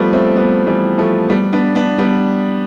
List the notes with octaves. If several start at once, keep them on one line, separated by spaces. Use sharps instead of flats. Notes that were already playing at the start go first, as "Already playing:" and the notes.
Already playing: F3 G3 A3 B3
A3 C4
G3 B3
E3 G3
F3 A3
G3 B3
B3 D4
B3 D4
G3 B3